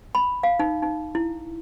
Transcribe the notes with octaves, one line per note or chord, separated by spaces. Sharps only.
B5
F5
D#4
D#4
E4